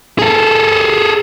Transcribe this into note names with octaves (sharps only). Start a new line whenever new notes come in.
G#4 A4